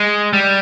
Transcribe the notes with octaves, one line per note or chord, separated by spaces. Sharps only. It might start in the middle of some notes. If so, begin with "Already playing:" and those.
Already playing: G#3
G3